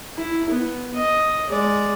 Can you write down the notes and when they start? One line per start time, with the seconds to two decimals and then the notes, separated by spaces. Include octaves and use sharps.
0.16 E4
0.50 B3
0.95 D#5
1.49 G#3 D5